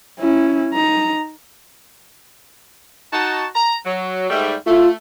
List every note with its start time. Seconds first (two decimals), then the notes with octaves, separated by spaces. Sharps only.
0.20 C#4 E4
0.74 D#4 A#5
3.12 D#4 F#4 A5
3.55 A#5
3.86 F#3
4.30 G#2 G3 A3
4.66 A3 F4